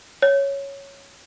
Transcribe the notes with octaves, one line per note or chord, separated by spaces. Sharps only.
C#5